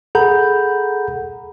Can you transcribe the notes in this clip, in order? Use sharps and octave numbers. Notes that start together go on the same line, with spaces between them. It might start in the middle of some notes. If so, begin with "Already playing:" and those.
G#4 A4 F#5 A#5 B5 G6